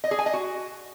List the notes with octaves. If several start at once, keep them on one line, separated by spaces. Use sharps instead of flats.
D#5
G#4
G#5
D#5
F#4